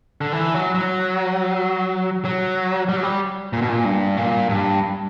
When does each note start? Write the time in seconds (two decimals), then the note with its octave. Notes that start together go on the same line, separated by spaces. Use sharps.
0.21 D3
0.33 E3
0.54 F#3
0.75 F#3
2.25 F#3
2.89 G3
2.96 F#3
3.03 G3
3.53 A#2
3.61 B2
3.69 A#2
3.85 G2
4.17 A#2
4.49 G2